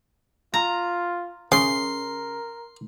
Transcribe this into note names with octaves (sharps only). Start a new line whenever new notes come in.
F4 A#5
C#3 A#4 C6